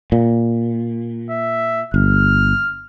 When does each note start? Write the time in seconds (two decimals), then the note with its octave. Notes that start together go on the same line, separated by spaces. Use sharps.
0.12 A#2
1.30 E5
1.94 G1 F6